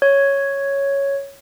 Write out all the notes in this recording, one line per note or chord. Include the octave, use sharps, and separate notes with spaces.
C#5